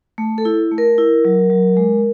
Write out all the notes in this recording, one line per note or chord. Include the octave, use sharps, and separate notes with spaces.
A3
A4
E4
A3
A#4
E4
F#3
F#3
G#3